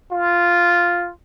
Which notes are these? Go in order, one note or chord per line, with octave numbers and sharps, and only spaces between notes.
F4